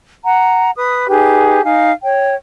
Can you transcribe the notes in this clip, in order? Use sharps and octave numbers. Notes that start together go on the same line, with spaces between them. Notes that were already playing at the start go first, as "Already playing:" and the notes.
F#5 A#5
B4 D#6
D#4 G4 G#4 B4
D#4 F5 G#5
C#5 G5